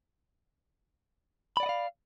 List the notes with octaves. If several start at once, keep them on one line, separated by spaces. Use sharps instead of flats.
D5 D#5 F5 F#5 B5